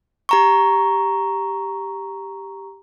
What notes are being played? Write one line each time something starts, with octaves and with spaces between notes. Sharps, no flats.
G4 A#5 C#6